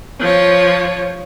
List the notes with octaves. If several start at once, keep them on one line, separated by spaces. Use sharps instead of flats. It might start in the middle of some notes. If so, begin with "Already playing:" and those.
F3 C#5